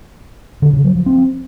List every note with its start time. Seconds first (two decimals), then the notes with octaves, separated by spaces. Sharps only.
0.62 D3
0.73 C#3
0.84 F#3
0.95 F3
1.06 C4